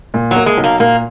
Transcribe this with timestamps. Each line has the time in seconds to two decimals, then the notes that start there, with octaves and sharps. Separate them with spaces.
0.14 A#2
0.31 F#3
0.36 A#3
0.46 G#3
0.58 B1
0.64 A#3
0.80 A#2 A#3